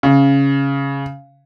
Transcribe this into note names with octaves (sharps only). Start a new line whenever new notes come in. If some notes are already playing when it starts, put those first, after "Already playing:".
C#3